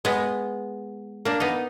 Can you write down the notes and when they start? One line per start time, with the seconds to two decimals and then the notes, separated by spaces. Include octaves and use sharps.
0.05 G#3 B3
1.25 A#3 D4
1.40 B3 D#4